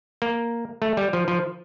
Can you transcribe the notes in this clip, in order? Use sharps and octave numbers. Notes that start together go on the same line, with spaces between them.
A#3
A3
G3
F3
F3